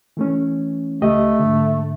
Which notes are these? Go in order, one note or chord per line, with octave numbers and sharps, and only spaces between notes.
E3 A3 C#4
C#2 A3 G4 D#5
G#2 D3